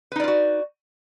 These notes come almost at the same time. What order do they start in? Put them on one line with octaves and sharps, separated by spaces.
B4 D#4 D5 F4 F#4